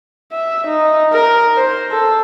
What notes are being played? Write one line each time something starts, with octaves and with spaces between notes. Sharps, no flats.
E5
D#4
A#4
C5
A4